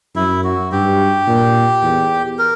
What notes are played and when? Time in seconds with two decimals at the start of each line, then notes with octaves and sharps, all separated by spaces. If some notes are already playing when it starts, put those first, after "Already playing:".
0.15 F#2 E4
0.44 F#4
0.72 G2 G4
1.27 A#2
1.83 E2
2.39 A#4